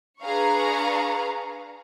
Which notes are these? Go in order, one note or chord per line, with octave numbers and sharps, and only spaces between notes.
D4 G#4 B4 F5 A#5 C#6